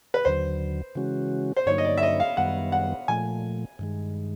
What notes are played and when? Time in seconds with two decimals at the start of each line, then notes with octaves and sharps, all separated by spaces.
0.14 B4
0.25 D#2 D3 F#3 C5
0.95 C#3 E3 G#3 C#4 F#4
1.57 C5
1.66 G2 D3 F#3 A#3 D#4 C#5
1.78 D#5
1.85 D5
1.97 E5
2.03 D#5
2.20 F5
2.37 F#2 D#3 G3 B3 F#5
2.72 F#5
3.08 A#2 F3 A3 G#5
3.79 G2 D#3 G#3